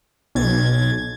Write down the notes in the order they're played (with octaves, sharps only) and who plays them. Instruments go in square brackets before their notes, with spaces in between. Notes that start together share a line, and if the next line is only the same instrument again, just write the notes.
[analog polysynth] B1 G#6 A6